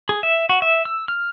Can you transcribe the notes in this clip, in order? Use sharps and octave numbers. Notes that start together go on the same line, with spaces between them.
G#4
E5
F#4
E5
E6
F6